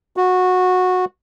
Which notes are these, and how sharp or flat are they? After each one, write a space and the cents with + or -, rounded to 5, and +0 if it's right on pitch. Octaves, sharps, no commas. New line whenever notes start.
F#4 -15